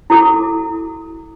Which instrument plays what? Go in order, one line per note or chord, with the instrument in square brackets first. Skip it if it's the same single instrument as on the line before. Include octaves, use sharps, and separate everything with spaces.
[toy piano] E4 F#4 A4 D6